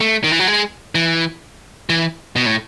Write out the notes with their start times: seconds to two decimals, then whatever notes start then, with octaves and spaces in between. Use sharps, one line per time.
0.01 A3
0.24 D#3
0.32 E3
0.40 F#3
0.47 G#3
0.95 E3
1.90 E3
2.36 B2
2.46 A2